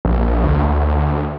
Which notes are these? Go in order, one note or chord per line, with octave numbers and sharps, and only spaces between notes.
A#1
D2